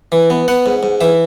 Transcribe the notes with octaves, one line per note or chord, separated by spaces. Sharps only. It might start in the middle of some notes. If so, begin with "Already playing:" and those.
E3
B3
B3 F#5
G#2
G#2
E3 E5